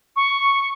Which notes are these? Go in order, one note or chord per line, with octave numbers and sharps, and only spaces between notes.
C#6